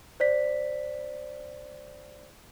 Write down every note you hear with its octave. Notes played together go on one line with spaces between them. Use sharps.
C5 D5 B6